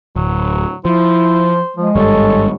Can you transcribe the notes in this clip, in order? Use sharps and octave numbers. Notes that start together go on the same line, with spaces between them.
D1 F#3
F3 E4 C5
F3 G#3
G#1 G2 G3 A4 C#5